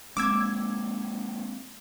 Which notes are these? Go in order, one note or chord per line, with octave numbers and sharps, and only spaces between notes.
G#3 A#3 C4 D6 E6 G#6